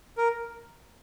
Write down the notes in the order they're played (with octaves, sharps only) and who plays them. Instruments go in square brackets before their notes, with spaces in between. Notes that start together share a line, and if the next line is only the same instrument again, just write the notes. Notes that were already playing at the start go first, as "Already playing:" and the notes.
[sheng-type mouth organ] A#4